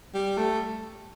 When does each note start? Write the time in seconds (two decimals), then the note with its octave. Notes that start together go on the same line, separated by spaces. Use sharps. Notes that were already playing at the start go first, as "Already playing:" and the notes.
0.14 G3
0.38 A3